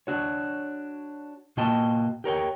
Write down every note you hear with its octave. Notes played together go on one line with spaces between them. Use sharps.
D4 F#4 C#5
A#2 A#3 F#4 D#5 G5 A5
G4 A#4 C#5 G5